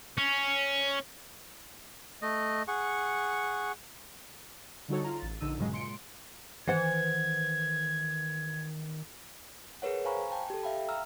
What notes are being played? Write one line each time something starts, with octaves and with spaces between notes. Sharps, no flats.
C#4
A3 D#5
G#4 F#5 C#6
D3 G3 D#4 F#4 A4 C#5
F4 A#5
A1 A6
A#1 D3 D#4 E6 D#7
G2 A#2 C#3 F#3 G#3
A#2 G#3 C6 C#7 D7
D#3 E3 C5 F#5 G#6
G#4 A#4 B4 C#5 F#5
C5 F5 G#5 A#5 B5 C#6
G5 A5
G4 A4
E5 F5 G5 B5
A#5 E6 F6